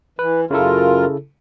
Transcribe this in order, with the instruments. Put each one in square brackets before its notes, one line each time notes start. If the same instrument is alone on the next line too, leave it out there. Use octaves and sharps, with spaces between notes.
[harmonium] E3 [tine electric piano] B4
[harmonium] F#2 F4 A#4 [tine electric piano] C#3 E4 A4